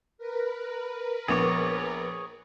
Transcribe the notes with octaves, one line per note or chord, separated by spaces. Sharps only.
A#4 B4
A#1 B3 G#4 C#5 D6